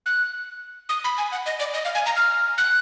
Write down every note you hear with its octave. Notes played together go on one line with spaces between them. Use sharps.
F#6
D#6
B5
G#5
F#5
D#5
D5
D#5
F5
G#5
A#5
F6
F#6